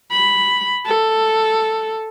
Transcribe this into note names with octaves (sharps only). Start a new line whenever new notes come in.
B5
A4